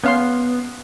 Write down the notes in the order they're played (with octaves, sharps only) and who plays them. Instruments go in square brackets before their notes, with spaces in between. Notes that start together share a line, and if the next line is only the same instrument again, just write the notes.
[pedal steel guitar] B3 [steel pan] C#4 F5 C6